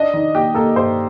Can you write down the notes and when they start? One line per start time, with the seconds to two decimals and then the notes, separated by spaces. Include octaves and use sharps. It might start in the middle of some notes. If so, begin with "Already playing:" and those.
Already playing: D4 D#5
0.14 D#3
0.34 A#3 G4
0.54 A#3 A4
0.75 G2 C5